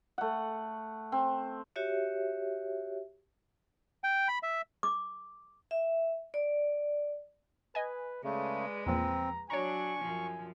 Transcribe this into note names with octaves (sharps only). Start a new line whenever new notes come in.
A3 F#5
C4
F#4 G4 C#5 E5
G5
B5
E5
D6
E5
D5
B4 D#5 G#5
C#3 G#3 A3 B4 D5
E2 A#2 F3 C4 A#5
F#3 D4 C#5 G#5 A#5 C#6
F#2 F3